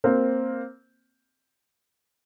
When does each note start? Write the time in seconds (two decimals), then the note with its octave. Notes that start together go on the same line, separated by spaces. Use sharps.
0.04 A#3 C4